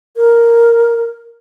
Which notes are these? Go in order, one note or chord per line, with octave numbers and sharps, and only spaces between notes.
A#4